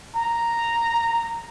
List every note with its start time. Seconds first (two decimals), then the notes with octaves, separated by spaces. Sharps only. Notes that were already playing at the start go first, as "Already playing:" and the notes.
0.16 A#5